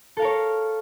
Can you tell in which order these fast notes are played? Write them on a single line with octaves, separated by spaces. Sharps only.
A4 F5 A#4 C#5